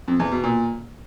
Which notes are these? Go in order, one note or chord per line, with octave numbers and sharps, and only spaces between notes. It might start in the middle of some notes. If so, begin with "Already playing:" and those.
F2
E2
B2
A#2